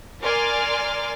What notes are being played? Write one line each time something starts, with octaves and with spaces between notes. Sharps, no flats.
A#4 D5 G#5 C6 D6 F6